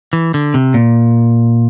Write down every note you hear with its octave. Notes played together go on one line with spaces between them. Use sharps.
E3
D3
C3
A#2